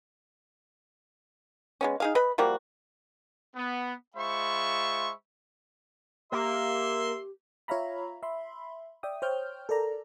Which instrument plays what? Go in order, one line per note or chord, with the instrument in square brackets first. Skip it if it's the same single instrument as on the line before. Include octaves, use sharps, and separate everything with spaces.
[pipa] G#3 B3 C#4
D#4 G#4 F5
B4 D#5 B5
F3 G3 A#3 F#4
[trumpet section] B3
G#3 F4 C5 E5 B5 C#6
[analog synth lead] A#3 [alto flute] G4 [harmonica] E5 C6
[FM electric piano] F4 C#5 E5 F5 A#5 B5
E5 B5 C6
D5 E5 G5 D#6
C5 C#5 G5 F6 G6
A4 A#4 D5 A#5